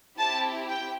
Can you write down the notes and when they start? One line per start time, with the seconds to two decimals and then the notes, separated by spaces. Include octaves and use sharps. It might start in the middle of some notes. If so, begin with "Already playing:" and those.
0.19 C4 E4 G4 A5
0.69 G5